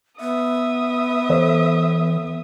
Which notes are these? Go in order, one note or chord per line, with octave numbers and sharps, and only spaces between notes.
B3 E5 D#6
E3 A4 C5 C#5